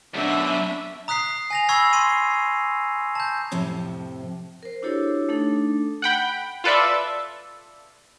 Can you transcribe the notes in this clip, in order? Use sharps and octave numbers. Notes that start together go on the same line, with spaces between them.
F#2 B2 D4 E5
A#5 D#6 F#6 B6 C7
G#5 A#6 F7
B5 C#6 E6 G#6 C7
C6 C7 D#7
A5 G6
F2 A2 C3 F3
A#4 C5
D4 E4 F#4 G4 A4 C#5
A3 D4 D#4 A4
F#5 G5 B5
F4 A4 B4 D5 E5